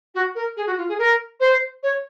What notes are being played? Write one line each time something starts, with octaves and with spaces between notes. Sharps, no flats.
F#4
A#4
G#4
F#4
F4
G#4
A#4
C5
C#5